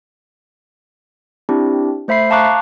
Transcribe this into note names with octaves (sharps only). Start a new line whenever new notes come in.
C4 D4 E4 G4
A3 C5 E5 B5 C7
F5 A5 A#5 C#6 D6 F#6